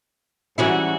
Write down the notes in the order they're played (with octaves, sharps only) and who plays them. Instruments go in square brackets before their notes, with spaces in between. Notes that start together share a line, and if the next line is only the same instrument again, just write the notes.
[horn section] G#2 G3 F#4 [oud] E3 C#4 E4